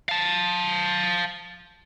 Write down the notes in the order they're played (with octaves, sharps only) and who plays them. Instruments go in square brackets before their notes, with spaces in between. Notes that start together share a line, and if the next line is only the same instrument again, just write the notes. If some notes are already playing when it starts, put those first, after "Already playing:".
[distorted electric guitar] F5 A5